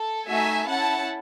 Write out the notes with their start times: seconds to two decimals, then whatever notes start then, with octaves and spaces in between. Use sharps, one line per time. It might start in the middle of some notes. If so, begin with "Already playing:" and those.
Already playing: A4
0.28 A3 D#4 F#4 E5 G#5
0.67 C#4 E4 A4 F#5 A5